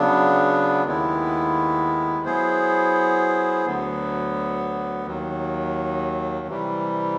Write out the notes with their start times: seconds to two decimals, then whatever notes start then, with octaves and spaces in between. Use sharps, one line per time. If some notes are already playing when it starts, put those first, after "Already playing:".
Already playing: C#3 F#3 B3 D4
0.85 D#2 D#3 G#3 B3 E4
2.25 F#3 B3 E4 G#4 C5
3.66 D2 D3 F#3 B3
5.07 D#2 D#3 F#3
6.47 C3 E3 G3